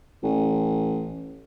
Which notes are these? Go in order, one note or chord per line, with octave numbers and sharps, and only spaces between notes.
A1